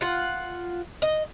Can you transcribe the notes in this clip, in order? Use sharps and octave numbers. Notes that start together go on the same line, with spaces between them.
F4 F#5
D#5